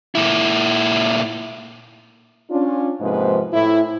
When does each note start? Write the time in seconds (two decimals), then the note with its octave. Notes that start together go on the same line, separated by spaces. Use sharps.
0.15 A#2 E4
2.50 C#4 D4 F4
3.00 G#2 C3 F3 G#3 A#3 B4
3.53 A2 E4